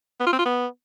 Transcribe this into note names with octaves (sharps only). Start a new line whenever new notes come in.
B3
F4
C4
F4
B3